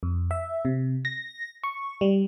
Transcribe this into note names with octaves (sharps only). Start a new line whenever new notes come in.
F2
E5
C3
A#6
C#6
G3